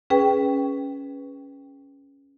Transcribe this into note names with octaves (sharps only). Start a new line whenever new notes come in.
C#4 G#4 B4 G5